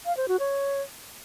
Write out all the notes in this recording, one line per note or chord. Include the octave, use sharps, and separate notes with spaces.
F5
C5
F#4
C#5